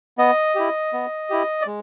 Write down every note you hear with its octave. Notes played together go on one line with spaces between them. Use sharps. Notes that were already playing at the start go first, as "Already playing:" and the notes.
B3 D#5
E4 G4
B3
E4 G4
D5
G#3